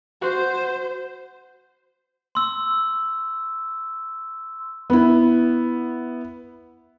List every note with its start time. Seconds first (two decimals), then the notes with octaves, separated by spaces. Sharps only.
0.22 F#4 C5 F#5 C6
2.35 C6 E6
4.90 B3 E4